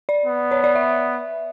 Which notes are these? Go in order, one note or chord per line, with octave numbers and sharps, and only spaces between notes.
D5
B3
C#5
D5
E5